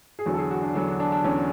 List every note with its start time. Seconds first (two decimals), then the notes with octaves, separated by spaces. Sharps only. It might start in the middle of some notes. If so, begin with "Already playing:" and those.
0.19 G#4
0.26 E2 D3 F#3 F#4
0.34 A4
0.38 G#4
0.51 F#4
0.62 D4
0.75 E2 D3 F#3 D4
0.88 D4
1.00 D4
1.12 D4
1.24 E2 D3 F#3 C#4